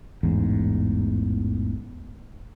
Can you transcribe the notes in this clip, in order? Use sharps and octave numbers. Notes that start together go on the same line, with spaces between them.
A1 E2 G#2